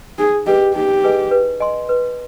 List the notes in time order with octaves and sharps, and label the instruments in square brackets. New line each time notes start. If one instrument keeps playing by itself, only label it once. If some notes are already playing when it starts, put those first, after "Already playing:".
[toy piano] D#4 [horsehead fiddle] G#4
[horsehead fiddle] G4 [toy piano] G#4 B4 D#5 G#5
[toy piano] D#4 [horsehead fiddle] G4
[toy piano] G#4 B4 D#5 G#5
B4
D#5 G#5 C6
B4